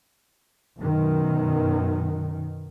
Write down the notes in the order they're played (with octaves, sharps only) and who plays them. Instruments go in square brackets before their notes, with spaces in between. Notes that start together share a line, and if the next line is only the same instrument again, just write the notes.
[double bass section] F#2 B2 D#3